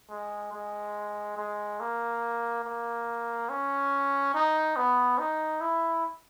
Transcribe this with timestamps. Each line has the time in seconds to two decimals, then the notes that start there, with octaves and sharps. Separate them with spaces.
0.10 G#3
0.53 G#3
1.37 G#3
1.80 A#3
2.64 A#3
3.49 C#4
4.34 D#4
4.76 B3
5.19 D#4
5.61 E4